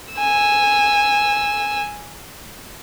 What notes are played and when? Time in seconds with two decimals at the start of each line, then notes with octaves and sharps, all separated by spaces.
0.14 G#5 E6